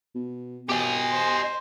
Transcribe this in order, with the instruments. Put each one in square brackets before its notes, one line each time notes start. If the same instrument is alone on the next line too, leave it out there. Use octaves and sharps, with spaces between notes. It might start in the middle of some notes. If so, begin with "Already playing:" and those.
[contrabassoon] B2
[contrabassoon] B2 [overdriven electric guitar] G4 D#5 [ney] G#5
[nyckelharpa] C5